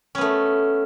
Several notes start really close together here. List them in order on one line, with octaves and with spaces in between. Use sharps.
C#4 B3 A3